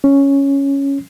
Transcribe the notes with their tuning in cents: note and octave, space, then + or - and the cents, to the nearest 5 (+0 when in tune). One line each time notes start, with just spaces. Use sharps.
C#4 +0